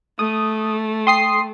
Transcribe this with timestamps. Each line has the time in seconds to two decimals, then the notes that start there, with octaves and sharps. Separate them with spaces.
0.19 A3 D#6
1.07 G5 C6 D#6 C7